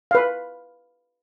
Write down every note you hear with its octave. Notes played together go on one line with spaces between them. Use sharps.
B4 F5